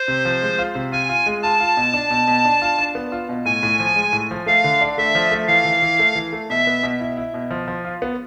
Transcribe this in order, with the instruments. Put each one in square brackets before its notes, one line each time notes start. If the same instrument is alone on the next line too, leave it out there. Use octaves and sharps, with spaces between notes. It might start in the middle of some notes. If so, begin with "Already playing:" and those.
Already playing: [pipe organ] C5
[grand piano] C3
F3
G#3
F4
C3
[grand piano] F4 [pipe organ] G#5
[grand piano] F4
G#3
[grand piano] F4 [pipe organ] A5
[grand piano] F4
B2
D4
B2
B2
D4
F4
D4
B3
F4
B2
[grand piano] A2 [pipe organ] G#5
[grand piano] A2
F3
G#3
A2
F3
[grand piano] A3 [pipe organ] F5
[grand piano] D3
D4
[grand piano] A3 [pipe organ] E5
[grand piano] F3
A3
[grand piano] E3 [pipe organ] F5
[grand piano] E3
E3
A3
E3
A3
[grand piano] B2 [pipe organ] E5
[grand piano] B3
B2
E4
E4
B2
F3
F3
F4
B3